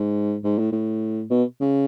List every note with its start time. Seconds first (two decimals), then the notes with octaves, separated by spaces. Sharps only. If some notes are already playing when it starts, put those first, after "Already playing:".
Already playing: G#2
0.44 G#2
0.59 A2
0.72 A2
1.30 B2
1.61 C#3